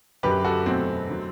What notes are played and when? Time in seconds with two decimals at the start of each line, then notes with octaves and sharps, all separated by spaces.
0.23 F#2 D3 F#3 G4 B4
0.45 F#4 A4
0.66 E2 B2 F#3 A3 C4
1.09 D3 F#3